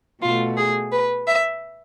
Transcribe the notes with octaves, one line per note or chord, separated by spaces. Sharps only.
B2 A3 F4
G#4
B4
E5